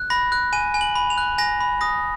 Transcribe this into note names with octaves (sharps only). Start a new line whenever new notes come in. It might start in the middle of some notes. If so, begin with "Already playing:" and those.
Already playing: F#6
B5 A#6
F#6
G#5 D#7
G#5
F#7
B5
F7
F#6
G#5 A#6
B5
D#6 A#6